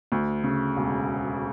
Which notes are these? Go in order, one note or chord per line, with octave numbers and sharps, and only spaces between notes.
D2
C#3
E1